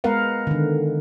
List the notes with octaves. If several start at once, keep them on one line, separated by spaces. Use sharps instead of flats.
G#3 B3 A#4 B4 F5 F#5
D3 D#3